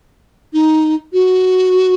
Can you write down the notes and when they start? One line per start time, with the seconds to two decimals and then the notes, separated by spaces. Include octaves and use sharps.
0.53 D#4
1.13 F#4